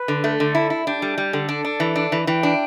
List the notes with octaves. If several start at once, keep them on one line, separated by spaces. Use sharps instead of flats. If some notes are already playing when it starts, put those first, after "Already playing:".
Already playing: B4
D3
A3
D3 A4
E4
E4
D4 G4
G3 A4
G3 G4
D3 A4
D4
D4
E3
D4
E3
E3 G5
D4